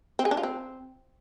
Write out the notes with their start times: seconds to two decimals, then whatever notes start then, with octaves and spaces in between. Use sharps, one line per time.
0.19 C4
0.25 G#4
0.31 D4
0.37 F4
0.43 C4